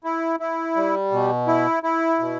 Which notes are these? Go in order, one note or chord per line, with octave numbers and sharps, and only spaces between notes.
E4
E4
G3
B2
E4
E4
B2